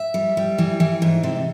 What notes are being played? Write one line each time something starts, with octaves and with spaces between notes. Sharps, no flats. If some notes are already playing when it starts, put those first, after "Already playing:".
Already playing: E5
G3
G3
E3
E3
G#2
C3